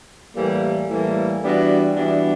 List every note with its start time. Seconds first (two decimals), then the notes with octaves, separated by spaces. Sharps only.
0.35 A2 E3 G3 A#3
0.88 A2 E3 G3 A#3
1.42 E3 G3 B3 D4 F#4
1.95 E3 G3 B3 D4 F#4